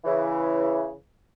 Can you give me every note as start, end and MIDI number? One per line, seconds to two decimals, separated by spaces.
0.05 0.92 49
0.05 0.92 52